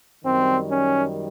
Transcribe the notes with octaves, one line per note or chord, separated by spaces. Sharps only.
F#2 D#3 G3 C4
C#4